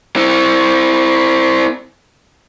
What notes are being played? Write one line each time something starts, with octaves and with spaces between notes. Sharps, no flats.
C4 E4